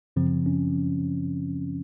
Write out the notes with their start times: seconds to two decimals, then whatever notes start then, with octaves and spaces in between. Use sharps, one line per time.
0.16 F#2 C#3 F3 C4
0.46 C#4